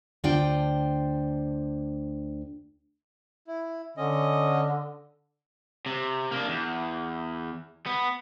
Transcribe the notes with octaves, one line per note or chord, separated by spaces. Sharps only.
D2 D4 F4 C5 G5
E4
D3 C#4 D#5
C3
A#3 D4
E2
B3